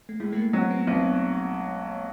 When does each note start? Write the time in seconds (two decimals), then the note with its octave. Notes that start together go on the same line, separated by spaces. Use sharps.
0.09 A3
0.20 A2 G#3
0.32 A3
0.37 A#3
0.53 F#3 C4
0.71 B3
0.87 B1 C4
0.95 B3